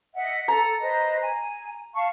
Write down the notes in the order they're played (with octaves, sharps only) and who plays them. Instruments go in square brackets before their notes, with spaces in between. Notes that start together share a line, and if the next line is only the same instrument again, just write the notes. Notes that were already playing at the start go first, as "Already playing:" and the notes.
[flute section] D#5 E5 F#5
[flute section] A4 [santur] A#5
[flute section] B4 C5 D#5
G#5
F5 A5 C#6